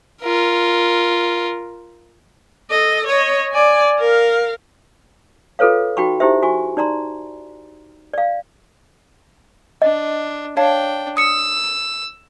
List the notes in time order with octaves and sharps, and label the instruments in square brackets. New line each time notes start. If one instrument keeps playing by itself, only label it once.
[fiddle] F4 A#4
[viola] A4 D#5
C#5 D#5
D5 G#5
A#4 F5
[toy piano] F4 G#4 A4 B4 C#5 F5
D#4 F#4 G5 B5 C#6
D#4 E4 G4 C5 E5
F#4 G#5 C#6
D#4 D5 A#5 C6
D5 F5
[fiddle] D4 [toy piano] D#5
[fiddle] D4 G5 [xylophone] C#5 F5 A5
[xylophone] D#6 C#7 [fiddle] E6